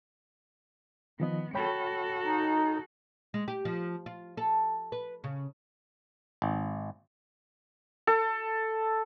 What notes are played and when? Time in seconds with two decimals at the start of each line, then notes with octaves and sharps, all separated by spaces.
1.20 D#3 F3 B3 D#5
1.55 F#4 A4 C#5 G5 B5
2.25 D#4
3.34 G#3
3.48 G4
3.65 F3
4.06 F4
4.37 A4
4.92 B4
5.24 C#3
6.42 G#1
8.07 A4